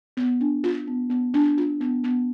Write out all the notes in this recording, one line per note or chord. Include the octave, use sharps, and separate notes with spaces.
B3
D4
F4
B3
B3
D4
F4
B3
B3